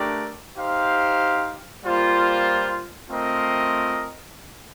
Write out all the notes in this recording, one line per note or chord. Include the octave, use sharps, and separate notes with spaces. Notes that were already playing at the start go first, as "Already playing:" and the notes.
Already playing: A3 D4 G4 A#4 D5
D#4 G4 C5 F5
G3 A#3 F4 C5
A3 C4 F4 A#4 D#5